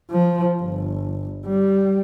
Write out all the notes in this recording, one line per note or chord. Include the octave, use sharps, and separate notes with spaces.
F3
G1
G3